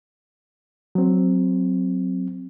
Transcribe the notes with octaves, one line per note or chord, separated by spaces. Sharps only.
F#3 C4